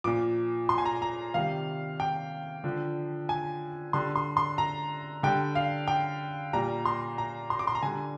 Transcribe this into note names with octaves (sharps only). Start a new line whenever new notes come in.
A#2 F3 D6
C6
G#5
A#5
A#5
C3 D#3 G3 F5
G5
D3 F3
G#5
D3 G3 C6
C6
C6
A#5
D3 G3 G5
F5
G5
A#2 G3 A#5
C6
A#5
C6
D6
C6
A#5
D3 G3 G#5